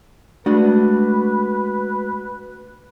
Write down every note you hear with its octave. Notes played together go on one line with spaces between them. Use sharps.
G#3 A3 D4 F#4 B4 F#5